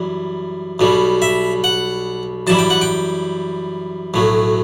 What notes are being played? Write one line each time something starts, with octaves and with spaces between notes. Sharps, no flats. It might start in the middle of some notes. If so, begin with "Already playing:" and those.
Already playing: F#2 E3 G3
B1 B2 G3
E5
F#5
F#2 E3 G3 A5
G5
F#5
G5
B1 A2 F#3